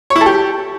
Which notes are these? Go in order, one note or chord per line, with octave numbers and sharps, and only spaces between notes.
C#5
E4
A4
G4